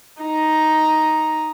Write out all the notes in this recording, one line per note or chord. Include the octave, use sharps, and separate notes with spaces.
D#4 A#5